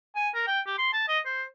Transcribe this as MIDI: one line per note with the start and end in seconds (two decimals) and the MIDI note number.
0.16 0.29 80
0.35 0.44 70
0.47 0.61 79
0.67 0.77 67
0.78 0.93 84
0.93 1.05 81
1.08 1.19 75
1.26 1.43 72